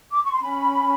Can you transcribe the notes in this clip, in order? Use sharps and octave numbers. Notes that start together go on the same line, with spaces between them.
D6
C#6
C6
C#4 B5